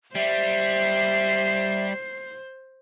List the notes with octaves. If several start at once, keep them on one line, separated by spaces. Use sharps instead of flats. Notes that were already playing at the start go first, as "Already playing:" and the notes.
G3 C5 E5 C7